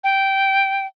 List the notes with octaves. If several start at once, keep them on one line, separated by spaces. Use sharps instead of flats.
G5